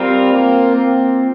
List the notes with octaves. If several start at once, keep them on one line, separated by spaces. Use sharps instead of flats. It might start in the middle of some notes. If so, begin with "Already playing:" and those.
Already playing: G3 C4 F4 A#4
A#3
A#3